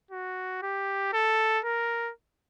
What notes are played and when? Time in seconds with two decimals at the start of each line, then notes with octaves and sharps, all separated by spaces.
0.11 F#4
0.62 G4
1.13 A4
1.65 A#4